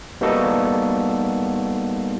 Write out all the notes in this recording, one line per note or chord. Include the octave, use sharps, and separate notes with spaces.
G3 A#3 B3 D#4 F#4 A4